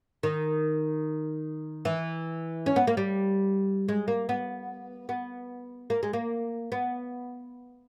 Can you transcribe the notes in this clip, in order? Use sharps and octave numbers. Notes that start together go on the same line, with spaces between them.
D#3
E3
C#4
B3
A#3
G3
G#3
A#3
B3
B3
A#3
G#3
A#3
B3